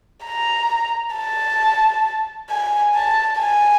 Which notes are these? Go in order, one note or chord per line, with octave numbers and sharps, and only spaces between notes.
A#5
A5
G#5
A5
G#5